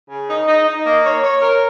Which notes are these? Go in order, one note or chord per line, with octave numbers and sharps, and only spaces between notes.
C#3
D#4
D#4
D#4
A#3
C#5
C#5
A#4